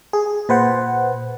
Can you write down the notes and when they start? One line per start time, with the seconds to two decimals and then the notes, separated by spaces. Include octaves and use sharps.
0.13 G#4
0.49 A#2 B4 C5 F#5